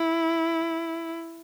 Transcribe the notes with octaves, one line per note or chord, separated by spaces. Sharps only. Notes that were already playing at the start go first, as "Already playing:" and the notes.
Already playing: E4